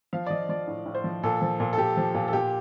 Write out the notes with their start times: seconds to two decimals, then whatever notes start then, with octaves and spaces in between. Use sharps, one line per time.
0.13 F3 F5
0.27 D5
0.30 F3 D#5
0.49 F3 D5
0.68 A2
0.86 A2
0.95 C5
1.04 F3
1.23 A#2 A4
1.42 F3
1.60 A#2
1.73 A4
1.78 A#2 G4
1.97 F3
2.15 A#2
2.28 A4
2.33 A#2 G4